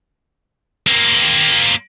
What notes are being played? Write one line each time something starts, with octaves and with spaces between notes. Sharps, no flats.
A#3 C4